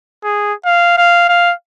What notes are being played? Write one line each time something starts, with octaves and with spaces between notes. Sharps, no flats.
G#4
F5
F5
F5